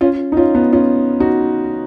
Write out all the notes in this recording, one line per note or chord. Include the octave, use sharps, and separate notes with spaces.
C#4 F4
D#4
C#4 F4
B3 D#4
C#4 F4
D#4 F#4